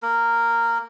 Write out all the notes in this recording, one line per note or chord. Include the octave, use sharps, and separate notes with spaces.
A#3 A#4